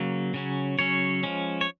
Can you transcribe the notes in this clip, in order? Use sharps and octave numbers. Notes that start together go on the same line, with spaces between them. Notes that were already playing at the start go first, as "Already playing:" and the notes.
Already playing: C#3 F#3 A#3
C#3 F#3 C#4
C#3 F#3 C#4 C#5
F3 G#3 C#4
C#5